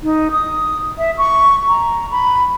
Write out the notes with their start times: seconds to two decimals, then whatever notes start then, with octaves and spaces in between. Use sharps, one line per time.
0.03 D#4
0.31 D#6
0.98 E5
1.18 C#6
1.68 A#5
2.11 B5